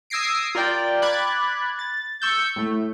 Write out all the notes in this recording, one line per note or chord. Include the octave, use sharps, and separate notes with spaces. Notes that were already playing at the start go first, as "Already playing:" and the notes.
D#6 E6 G#6 A#6 C7 D7
F4 A#4 D5 G5
B5 D6 F#6 G#6 A6
A6
C#6 E6 G6
A2 A3